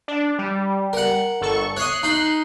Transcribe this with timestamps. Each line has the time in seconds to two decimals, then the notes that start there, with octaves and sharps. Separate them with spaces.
0.08 D4
0.39 G3
0.93 A#4 F#5
1.41 G1 A4 C#6
1.77 C#5 D#5 F#6 C7
2.03 D#4 C6